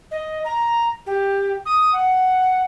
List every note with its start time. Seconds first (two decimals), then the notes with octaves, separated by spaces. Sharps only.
0.11 D#5
0.45 A#5
1.06 G4
1.66 D#6
1.93 F#5